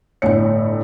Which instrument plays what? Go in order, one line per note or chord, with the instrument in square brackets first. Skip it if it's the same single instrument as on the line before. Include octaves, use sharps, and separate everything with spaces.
[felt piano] G1 A2 C#7 [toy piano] C#5 G#5